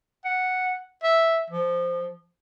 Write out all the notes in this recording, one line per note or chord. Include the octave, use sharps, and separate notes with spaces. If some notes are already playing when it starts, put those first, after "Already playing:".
F#5
E5
F3